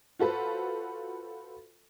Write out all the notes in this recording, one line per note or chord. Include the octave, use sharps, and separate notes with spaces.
F4 F#4 A4 B4 C5